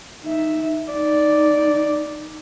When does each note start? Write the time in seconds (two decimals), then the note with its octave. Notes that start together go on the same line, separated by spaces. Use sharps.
0.23 D#4 E5
0.92 D#4 D5